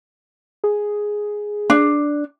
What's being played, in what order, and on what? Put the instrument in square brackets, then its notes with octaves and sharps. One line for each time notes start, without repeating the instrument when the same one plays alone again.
[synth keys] G#4
[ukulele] D4